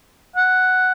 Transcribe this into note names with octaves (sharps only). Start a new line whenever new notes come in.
F#5